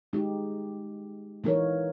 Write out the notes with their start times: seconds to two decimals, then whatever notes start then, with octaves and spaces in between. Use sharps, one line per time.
0.13 G#3 D#4 G4
1.44 E3 A#3 D#4 A#4 C#5